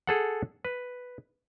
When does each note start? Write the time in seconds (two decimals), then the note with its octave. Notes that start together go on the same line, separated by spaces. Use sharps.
0.07 G#4 A4 F#5
0.65 B4